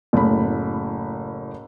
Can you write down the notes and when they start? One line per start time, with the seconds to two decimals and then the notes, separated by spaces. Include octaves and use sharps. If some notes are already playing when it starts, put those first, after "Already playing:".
0.13 F#1 A2 B5